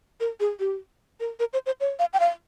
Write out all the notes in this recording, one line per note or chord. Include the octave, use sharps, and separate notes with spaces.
A#4
G#4
G4
A#4
A#4
C5
C5
C#5
F5
G5
F5